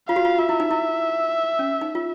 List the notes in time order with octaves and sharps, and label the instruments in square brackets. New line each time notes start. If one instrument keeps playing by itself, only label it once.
[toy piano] F4 [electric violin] F5
[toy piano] F#4
F4
[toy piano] F4 [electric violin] E5
[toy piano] E4
D#4
E4
C#4
D#4
F4